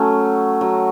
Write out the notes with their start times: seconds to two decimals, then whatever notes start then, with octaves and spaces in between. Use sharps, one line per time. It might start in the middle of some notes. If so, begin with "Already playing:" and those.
Already playing: F#3 A3 C#4
0.61 F#3